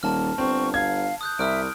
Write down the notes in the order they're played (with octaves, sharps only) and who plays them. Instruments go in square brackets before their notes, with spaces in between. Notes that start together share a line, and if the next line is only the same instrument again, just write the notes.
[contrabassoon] D#1 [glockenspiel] A5 F6
[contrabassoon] G1 [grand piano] C4 [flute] C#6
[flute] F5 [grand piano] G#6
[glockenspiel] D#6 F#6 G6
[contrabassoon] C2 [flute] E5 [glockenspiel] D#6 F6 D7